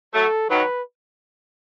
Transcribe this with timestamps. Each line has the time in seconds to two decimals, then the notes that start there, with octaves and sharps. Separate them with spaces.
0.14 F#3 A3 A4
0.50 D#3 F#3 B4